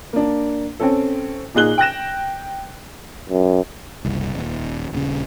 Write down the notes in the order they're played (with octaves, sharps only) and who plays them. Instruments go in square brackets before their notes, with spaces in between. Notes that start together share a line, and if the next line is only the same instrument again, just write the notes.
[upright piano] A#3 D4
C4 C#4 A4
A#2 D#4 G#4 F#6 G7
G5 F#6 A#6 E7
[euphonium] F#2
[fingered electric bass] F#1 C2
D#1
D#1 C#3